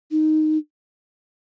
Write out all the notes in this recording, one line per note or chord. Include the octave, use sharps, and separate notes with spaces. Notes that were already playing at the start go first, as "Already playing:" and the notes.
D#4